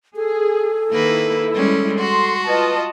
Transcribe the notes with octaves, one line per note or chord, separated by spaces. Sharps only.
G#4 A4
D#3 A#3 E4 B4
G3 G#3 C#4
F#4 C6
F4 B4 D#5 A5